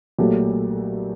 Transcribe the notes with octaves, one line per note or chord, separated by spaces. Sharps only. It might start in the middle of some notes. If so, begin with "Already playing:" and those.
B1 A#2 F#3 A3 G4 A4